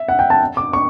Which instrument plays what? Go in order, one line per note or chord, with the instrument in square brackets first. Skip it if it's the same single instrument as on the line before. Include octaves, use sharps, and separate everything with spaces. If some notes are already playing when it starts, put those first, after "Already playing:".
Already playing: [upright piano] E5
F#5
G5
A5
D6
C#6